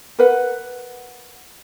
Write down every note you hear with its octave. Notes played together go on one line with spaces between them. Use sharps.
A#4 B4 F#5